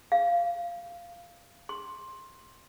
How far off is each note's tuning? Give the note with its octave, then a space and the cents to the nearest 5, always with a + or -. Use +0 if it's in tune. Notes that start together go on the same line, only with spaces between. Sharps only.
F5 -10
C6 +15